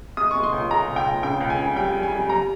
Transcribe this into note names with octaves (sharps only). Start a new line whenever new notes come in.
G#3 D#6
G#3 C#6
C6
C#2
G#3 A#5
C#2
G5
C#2
C#3 G5
C#2
G#5
C#3
G3 G5
G3
G#5
G3
G3 A#5